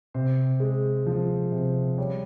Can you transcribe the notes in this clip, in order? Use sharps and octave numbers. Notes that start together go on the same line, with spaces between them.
C3 C5
G#3
F3
C3
G3 C#5